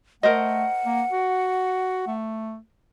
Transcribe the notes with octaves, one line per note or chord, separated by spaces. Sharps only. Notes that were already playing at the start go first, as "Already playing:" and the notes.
A3 A#4 C5 D#5 F#5
A#3
F#4
A3